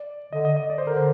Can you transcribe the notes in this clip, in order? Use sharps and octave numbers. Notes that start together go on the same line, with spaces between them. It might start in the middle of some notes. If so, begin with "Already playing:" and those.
Already playing: D5
D3 D#5
D#5
D#5
D5
D3 C5
A#4
C5